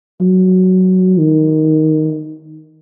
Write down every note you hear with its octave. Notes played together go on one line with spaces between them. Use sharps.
F#3
D#3